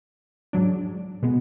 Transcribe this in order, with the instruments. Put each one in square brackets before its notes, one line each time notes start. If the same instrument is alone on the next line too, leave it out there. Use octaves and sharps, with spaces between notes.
[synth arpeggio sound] G#2 F#3 D4
B2 G#3 B3